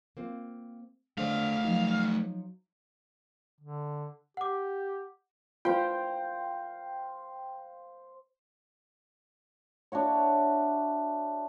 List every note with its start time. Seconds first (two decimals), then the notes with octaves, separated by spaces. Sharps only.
0.17 A#3 C4 F4
1.18 D3 G#3 A3 D4 C5 F5
1.63 F3 F#3 D#4
3.60 D3
4.37 G4 F#5 D6
5.65 F4 C5 F5 G5
9.92 D4 E4 F#4 C#5